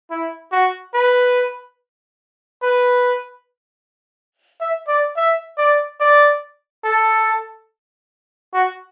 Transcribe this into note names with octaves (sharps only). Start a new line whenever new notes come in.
E4
F#4
B4
B4
E5
D5
E5
D5
D5
A4
F#4